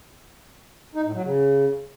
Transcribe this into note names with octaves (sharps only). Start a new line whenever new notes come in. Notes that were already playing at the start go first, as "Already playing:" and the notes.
D#4
A2
F#3
C#3